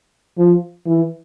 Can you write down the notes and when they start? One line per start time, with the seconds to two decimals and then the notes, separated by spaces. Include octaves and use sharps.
0.38 F3
0.86 E3